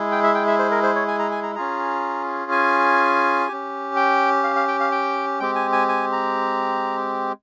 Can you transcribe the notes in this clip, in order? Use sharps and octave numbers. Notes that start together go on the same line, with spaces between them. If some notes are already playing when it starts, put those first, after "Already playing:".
Already playing: G#3 E4 G#4
G5
E5
G5
E5
C5
A#4
C5
C#5
G#5
A#5
G#5
A#5
C#4 F4 G#4 A#5
G#5
C#4 G4
G5
F5
F5
G5
F5
G5
G#3 C4 G4 G5
G#5
G#5
G#5
A#5